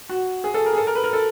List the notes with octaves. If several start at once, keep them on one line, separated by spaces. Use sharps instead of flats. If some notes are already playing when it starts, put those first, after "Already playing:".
F#4
G#4
A4
A#4
G#4
A4
A#4
B4
A#4
A4